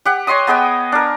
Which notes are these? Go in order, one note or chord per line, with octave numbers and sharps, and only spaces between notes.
G4 F#5
C#5 D#5 C6 D#6
B3 G#4 D#5 G5
D4 A#4